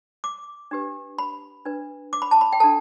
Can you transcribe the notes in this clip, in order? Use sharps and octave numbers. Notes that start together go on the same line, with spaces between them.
D6
D4 G4 B4
B5
D4 B4
D6
B5
A5
B5
G5
D4 A4 A5